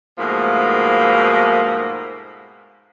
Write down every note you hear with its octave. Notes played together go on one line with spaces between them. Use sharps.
G#2 B2 F3 A3 A#3